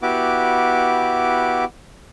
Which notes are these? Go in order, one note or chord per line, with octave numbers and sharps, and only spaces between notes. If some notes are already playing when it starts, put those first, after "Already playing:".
B3 E4 F#4 G4 D6